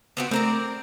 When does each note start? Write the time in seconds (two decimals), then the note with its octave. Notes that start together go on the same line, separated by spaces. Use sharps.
0.17 B3 C4 F#4
0.31 A3 C4 A#4 D5